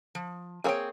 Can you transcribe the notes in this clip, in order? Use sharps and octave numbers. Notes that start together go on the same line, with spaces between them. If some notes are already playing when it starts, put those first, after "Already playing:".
F3
A#3 C4 G#4 C#5 G5